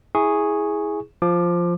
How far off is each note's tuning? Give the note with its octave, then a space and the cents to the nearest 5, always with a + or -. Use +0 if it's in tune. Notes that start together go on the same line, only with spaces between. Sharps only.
E4 -15 G#4 +0 C#6 -5
F3 +0 D6 +25